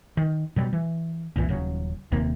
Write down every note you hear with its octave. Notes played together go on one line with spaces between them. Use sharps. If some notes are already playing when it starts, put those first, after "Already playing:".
D#3
B2 F#3 G3
E3
F#1 C2 A#2 E3
D#1 C#3 F#3
D#1 D#2 C3 A#3